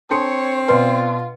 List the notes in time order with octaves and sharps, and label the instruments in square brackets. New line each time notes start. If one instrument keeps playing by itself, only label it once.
[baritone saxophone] C4 [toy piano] D4 A4 A5 [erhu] C#5 [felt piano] C6 C#7
[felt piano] B2 D5 C6 [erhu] F4 [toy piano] B4